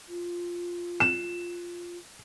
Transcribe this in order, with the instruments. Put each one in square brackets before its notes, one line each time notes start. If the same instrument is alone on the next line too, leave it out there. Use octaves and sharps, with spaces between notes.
[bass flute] F4
[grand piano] E7